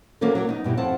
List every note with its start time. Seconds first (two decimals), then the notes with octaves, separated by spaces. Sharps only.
0.21 E3 F#3 A#3 C4 C#4 A4
0.35 F#3 A#3
0.47 B3 D4 D#4
0.64 G2 B2 G3 E4
0.77 F2 C4 F#5 A5